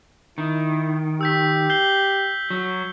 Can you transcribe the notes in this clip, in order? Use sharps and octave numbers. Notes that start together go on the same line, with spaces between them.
D#3 E4
G4 E6 G6 B6
G6 C7 G7
F#3